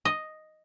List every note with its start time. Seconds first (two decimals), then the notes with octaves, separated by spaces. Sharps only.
0.05 D#5